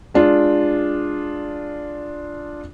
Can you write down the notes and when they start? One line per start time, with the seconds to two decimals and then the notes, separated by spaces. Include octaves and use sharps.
0.14 G#3 D4 F4